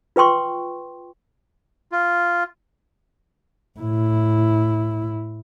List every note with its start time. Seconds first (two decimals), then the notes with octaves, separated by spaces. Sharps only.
0.16 F4 B4 G5 C6 C#6
1.92 F4
3.79 A2 E4